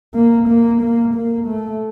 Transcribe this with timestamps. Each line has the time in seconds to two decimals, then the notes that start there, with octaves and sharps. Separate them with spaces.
0.15 A#3
0.48 A#3
0.82 A#3
1.15 A#3
1.48 A3